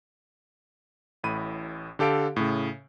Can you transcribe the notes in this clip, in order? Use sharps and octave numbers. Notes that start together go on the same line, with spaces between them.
A1 A2 B5 D#7
D3 G4 A4 F5 D7
A2 C#3